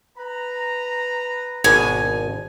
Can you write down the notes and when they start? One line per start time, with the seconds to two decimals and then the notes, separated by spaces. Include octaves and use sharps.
0.17 B4 A#5
1.64 G#1 B2 D4 G#5